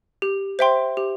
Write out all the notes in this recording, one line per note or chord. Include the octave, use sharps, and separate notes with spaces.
G4
C5 E5 G5 C6
G4